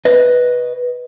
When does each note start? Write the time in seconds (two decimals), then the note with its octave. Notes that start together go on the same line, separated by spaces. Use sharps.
0.05 B4 D#5